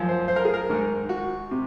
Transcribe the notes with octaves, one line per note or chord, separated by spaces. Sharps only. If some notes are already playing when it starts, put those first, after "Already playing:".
Already playing: F#2 F3
C5
C5
A#4
G#4
A#4
G#2 D#3
F#4
C3